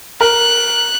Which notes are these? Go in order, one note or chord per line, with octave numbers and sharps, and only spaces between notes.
A#4 F#6